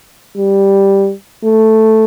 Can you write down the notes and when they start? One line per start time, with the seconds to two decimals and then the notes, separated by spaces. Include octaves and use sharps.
0.37 G3
1.44 A3